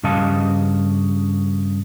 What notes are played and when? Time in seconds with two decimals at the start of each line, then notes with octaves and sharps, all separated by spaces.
0.03 G2 C#3 D#5 F5 A5